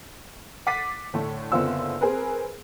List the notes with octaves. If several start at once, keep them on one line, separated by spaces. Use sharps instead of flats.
F#5 D6 A6 B6 C7 D#7
A2 D3 A3
F#1 D3 B3 C4 F4 E6
C4 G#4 A#4 B4